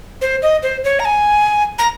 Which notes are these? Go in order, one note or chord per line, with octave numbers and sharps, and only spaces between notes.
C5
D#5
C5
C#5
A#5
G#5
A#5